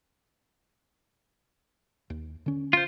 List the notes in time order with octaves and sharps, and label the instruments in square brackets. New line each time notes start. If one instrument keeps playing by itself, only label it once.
[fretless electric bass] D#2
D3 C#4
[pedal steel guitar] F4 C5